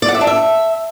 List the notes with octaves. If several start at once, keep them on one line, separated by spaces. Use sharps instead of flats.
D5
F#5
E5
D4
E5